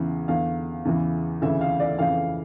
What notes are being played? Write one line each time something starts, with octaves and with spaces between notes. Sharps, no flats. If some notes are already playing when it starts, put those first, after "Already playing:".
Already playing: E2 C#3 E3 E5
E2 D3 F5
E2 C#3 E3
D2 C#3 E3 E5
F5
D5
F2 C#3 E3 F5